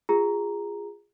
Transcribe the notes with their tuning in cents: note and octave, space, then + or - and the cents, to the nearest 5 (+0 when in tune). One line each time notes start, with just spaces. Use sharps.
F4 +0 G#4 -20 A#5 +0